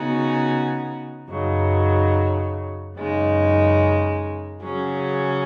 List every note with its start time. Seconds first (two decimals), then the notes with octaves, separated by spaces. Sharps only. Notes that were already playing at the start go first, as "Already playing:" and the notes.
Already playing: C#3 B3 D#4 F#4
1.29 F#2 C#3 F#3 D#4
2.96 F#2 C#3 G#3 D#4
4.62 C#3 F#3 C#4 G#4